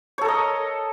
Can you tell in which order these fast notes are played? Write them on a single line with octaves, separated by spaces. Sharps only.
C#5 A4 A#4 D#5